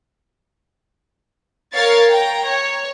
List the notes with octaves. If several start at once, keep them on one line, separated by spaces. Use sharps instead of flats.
A#4 C#5 F5 A6
G5 A#5
C#5